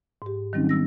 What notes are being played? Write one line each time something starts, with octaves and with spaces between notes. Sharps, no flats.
G#2 G4
D#3 F#3 G3 C4 C#4 D#4
B3 E6 A#6